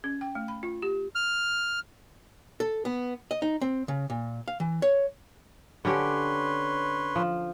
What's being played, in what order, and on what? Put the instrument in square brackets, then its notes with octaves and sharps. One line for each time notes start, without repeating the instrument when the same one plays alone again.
[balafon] C#4
G5
A3
B5
F4
G4
[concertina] F6
[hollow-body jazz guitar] A4
B3
D#5
D#4
C4
C#3
A#2
F5
E3
C#5
[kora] D3 C#4 G4 [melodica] B4 C#5 C6
[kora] F3